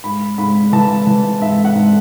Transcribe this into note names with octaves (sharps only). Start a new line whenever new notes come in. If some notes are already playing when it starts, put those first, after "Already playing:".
G#2 B5
G#2 B5
E3 A5
E3
G#2 E5
F#5
G#2